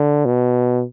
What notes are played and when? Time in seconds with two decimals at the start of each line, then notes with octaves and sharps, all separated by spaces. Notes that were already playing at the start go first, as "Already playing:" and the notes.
Already playing: D3
0.25 B2